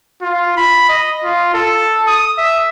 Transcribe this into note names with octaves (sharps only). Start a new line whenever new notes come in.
F4
B5
D#5
F4
A4
D#6
E5